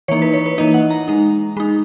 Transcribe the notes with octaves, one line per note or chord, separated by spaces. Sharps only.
E3 A#3 D#4 C#5
B4
C#5
B4
E3 A#3 D#4 D#5
F#5
A#5
G#3 D#4
G#3 D#4 B5